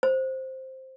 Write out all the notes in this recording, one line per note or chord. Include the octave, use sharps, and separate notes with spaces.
C5